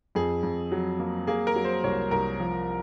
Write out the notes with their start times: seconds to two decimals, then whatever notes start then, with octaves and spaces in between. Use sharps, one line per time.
0.15 F2 G#4
0.43 F2
0.72 F#3
1.00 A#3
1.27 A#3 G#4
1.47 A#4
1.56 F#3
1.65 C5
1.84 C2 C#5
2.11 C2 A#4
2.40 F3